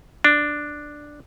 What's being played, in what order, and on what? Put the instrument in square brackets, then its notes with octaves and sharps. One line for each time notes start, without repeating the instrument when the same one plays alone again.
[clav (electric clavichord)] D4